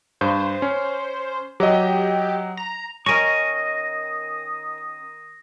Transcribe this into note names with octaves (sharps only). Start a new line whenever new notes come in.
G2 C5
C#4
F#3 G4 D#5
A#5
D#3 C#4 A#4 D#5 G#5 C#6 D#6 A#6